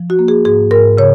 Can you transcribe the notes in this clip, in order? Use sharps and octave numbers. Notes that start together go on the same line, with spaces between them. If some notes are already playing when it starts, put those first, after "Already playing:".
Already playing: F3
F#4
A#3
G#4
G#2 G#4
G#2 A#4
C#3 C#5